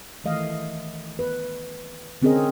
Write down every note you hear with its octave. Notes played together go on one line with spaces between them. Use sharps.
D#3 E3 A3 D#5 F5
B4
D3 C4 C#4 G#4 A#4 D#5